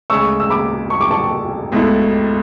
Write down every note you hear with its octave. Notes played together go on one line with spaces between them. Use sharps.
D2 C#3 G#3 C#4 C#6 E6
E6
B5 D6
C#6
D6
A5 C#6
C#2 B2 A3 E4